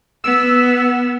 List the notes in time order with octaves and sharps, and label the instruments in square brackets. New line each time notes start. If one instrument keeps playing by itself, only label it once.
[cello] B3 [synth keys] E6